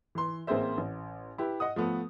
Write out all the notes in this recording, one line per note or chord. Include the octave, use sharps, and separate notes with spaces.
E3 C6
A1 A#3 C4 G#4 C5 E5
A1
E4 G4 B4
D#5 F#5 D#6
F3 A3 B3 B4